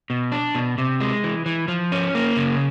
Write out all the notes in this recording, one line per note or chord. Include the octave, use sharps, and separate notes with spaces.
B2
D4
B2
C3
G#3
E3
E3
F3
C#4
A#3
C#3